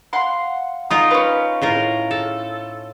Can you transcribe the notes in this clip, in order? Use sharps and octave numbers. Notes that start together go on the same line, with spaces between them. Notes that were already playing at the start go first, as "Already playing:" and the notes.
F5 F#5 C6
D#4 F4 A#4 D#6
C#4 B4
A2 F4 A#4
A4